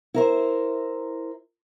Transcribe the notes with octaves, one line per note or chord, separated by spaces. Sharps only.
E4 A#4 C5